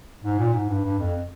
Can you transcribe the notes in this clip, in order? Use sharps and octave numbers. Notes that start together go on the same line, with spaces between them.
G#2
A#2
G#2
G2
G2
F2